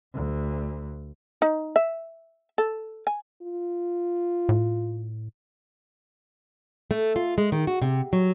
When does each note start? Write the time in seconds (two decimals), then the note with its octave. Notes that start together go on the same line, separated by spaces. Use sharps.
0.14 D2
1.42 D#4
1.76 E5
2.58 A4
3.07 G#5
3.42 F4
4.49 A2
6.91 A3
7.16 F4
7.38 G#3
7.52 D#3
7.67 F#4
7.82 C3
8.13 F#3